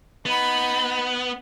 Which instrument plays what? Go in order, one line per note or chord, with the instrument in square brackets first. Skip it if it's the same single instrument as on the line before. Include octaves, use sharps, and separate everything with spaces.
[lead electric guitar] B3 [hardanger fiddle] D#4 B5